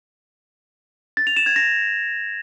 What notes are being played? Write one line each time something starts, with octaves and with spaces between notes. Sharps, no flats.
A6
F7
E7
G#6
A#6